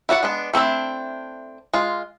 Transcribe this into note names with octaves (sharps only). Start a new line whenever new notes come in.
E4 F#4 D5 F#5
G#3 B3 D4
A3 C4 D4 E4
G#3 F4